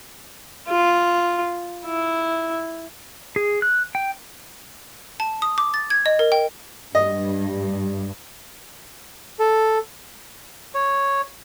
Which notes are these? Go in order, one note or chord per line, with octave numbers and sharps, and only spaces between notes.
F4
E4
G#4
F#6
G5
A5
D#6
D6
A6
G#6
D#5
A#4
G5
G2 D#5
A4
C#5